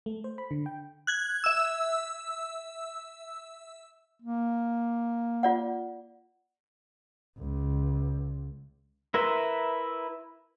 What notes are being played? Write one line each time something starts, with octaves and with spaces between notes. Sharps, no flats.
A3
C5
B5
D3
G5
F#6 G#6
E5 E6
A#3
F4 D5 F#5
C#2
E4 A#4 B4 E5 C6